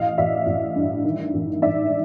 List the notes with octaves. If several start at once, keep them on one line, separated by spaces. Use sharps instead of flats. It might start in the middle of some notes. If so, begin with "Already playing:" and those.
Already playing: A1 D#5 F5
A1 D5 E5
A1
G2
D#3
A1
G#2 D5 E5